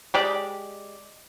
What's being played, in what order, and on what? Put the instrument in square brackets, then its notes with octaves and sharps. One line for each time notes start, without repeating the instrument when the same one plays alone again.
[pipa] G#3 G4 D5